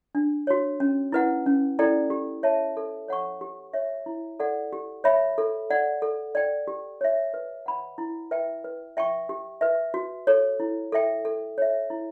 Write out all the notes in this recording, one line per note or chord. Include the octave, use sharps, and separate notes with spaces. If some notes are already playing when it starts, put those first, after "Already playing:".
D4
F#4 C#5
C#4
E4 B4 F#5
C#4
E4 A4 D5 G5
G4
C#5 E5 A5
A4
C#5 F#5 C#6
G4
C#5 E5
E4
A4 D5 F#5
G4
C#5 E5 B5
A4
D5 F#5
A4
D5 G5
G4
C#5 E5
B4
F#5 B5
E4
B4 E5 G5
B4
E5 G5 C#6
G4
B4 E5
F#4
A4 C#5
E4
A4 E5 G5
A4
C#5 E5
E4